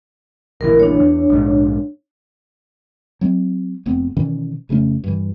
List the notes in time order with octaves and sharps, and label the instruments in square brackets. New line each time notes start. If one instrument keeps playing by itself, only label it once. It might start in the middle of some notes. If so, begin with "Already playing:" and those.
[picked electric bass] D1 A#1 E3 [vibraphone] A#4
[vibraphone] D4 C#5
[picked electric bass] E2
A#1 G#2
[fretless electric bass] F#3 C4
F1 F2 B3 C4
B2 D#3 E3 C#4
F1 C#3 A3 C#4
G2 E3